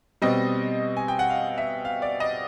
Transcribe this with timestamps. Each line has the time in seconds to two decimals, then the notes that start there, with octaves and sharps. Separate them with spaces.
0.22 B2 G3 C4 D#5
0.97 G#5
1.08 G5
1.19 F#5
1.30 F5
1.58 E5
1.85 F5
2.02 D5
2.20 D#5